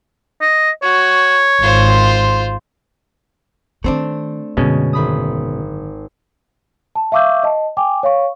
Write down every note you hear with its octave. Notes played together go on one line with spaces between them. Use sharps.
D#5
F#4 C#5
G#1 F4 C5
D#3 E3 A3 C4 D4
F#2 B2 D3 G#3 C#4
G#1 B5 D#6
A5
E5 F5 C#6 D6 E6 G6
D#5 A5
G5 G#5 D6
C#5 F5 C#6